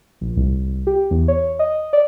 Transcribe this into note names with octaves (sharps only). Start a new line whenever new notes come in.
A#1
C2
C2
G4
E2
C#5
D#5
D5